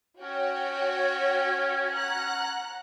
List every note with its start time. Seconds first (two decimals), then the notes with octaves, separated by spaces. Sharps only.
0.22 C#4 F#4 C#5 G5
1.98 F#5 A#5 F#6